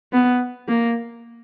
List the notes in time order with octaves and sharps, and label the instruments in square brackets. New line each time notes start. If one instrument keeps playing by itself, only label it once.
[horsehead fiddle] B3
A#3